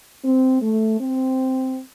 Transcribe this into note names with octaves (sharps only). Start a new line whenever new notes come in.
C4
A3
C4